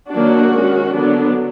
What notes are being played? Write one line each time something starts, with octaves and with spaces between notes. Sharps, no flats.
D#3 F#3 A#3 D4 F#4
D#3 G#3 C#4
D3 F#3 B3 D4